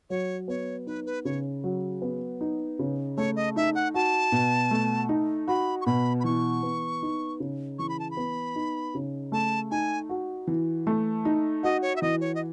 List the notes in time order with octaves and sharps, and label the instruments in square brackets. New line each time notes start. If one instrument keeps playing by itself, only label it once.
[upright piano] F#3 [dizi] C#5
[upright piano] B3 [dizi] C#5
[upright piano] D#4 [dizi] B4
[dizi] B4
[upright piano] C#3 [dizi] C#5
[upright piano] F#3
B3
D#4
C#3
[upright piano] A3 [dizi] C#5
[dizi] D#5
[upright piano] D#4 [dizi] E5
[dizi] F#5
[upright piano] F#4 [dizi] A5
[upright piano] B2
A3
D#4
[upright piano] F#4 [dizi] B5
[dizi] C#6
[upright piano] B2 [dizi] B5
[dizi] B5
[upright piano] E3 [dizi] C#6
[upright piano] B3
D#4
C#3
[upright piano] E3 [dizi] C#6
[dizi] B5
A5
B5
[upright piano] B3
D#4
C#3
[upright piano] A3 [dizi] A5
[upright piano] D#4 [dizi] G#5
[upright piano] F#4
E3
A3
D#4
[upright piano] F#4 [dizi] D#5
[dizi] C#5
E5
[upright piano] E3 [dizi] D#5
[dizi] C#5
D#5